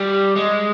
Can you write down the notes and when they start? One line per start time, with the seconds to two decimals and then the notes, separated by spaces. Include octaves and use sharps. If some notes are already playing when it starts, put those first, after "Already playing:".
Already playing: G3
0.36 G#3